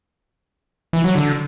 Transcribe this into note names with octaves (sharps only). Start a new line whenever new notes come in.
E3
F#3
D3